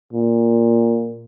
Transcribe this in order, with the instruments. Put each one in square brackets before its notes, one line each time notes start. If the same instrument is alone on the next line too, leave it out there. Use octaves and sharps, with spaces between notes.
[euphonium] A#2